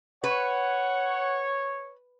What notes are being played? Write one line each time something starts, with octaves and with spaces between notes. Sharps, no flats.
B4 C#5 F#5